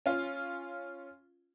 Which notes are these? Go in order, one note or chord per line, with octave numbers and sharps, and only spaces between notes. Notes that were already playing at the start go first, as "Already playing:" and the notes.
C#4 F4